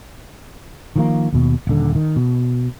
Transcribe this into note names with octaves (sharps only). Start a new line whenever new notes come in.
D#3 F3 A#3
D#2 B2
D#1 D3
D#3
B2